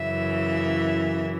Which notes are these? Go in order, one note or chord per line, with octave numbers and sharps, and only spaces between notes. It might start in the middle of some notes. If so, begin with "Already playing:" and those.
Already playing: F#2 C#3 E3 E5